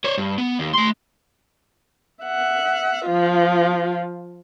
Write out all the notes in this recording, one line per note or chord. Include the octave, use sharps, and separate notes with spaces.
C5 C#5
G2
B3
D#2
A3 C6
E5 F#5
F3 F4